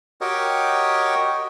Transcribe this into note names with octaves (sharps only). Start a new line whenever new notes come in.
F#4 G4 A#4 C#5 D#5 G5